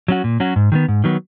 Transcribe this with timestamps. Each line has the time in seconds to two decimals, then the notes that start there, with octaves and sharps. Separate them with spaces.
0.08 F#3 C#4 F#4
0.24 A#2
0.40 F#3 C#4 F#4
0.56 G#2
0.72 D#3 F#3 B3
0.88 G#2
1.04 D#3 F#3 B3